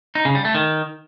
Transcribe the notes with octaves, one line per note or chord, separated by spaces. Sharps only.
D#4
C#3
G3
A3
D#3